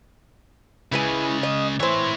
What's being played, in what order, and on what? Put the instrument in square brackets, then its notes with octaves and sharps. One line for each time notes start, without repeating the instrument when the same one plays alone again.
[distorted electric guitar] C#3 G#3 [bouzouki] E4 B4 G#5
[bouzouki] D#5
[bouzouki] E3 C4 [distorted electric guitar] E4 C#5